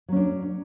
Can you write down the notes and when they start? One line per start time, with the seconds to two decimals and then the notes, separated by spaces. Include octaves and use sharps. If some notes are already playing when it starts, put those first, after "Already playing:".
0.09 F#3
0.12 C#4
0.16 D4